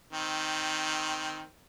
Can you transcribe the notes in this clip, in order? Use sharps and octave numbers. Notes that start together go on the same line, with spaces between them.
D#3 C4